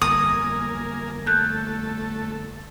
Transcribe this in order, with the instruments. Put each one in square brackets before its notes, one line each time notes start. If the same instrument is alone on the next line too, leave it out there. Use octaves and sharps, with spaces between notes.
[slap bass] G1 F2 [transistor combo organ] A#3 A#4 G#5 [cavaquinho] D#6
[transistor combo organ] A3 A4 [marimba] F#6 G6